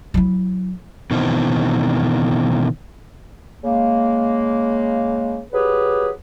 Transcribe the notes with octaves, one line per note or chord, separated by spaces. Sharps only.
F#3 E4
B2 D#3 E3 C4
C#3 G#3 A#3
F#3 G4 G#4 B4